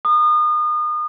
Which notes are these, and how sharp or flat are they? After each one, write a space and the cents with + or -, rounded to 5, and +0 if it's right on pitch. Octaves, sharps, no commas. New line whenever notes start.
A#5 +0 D#6 -35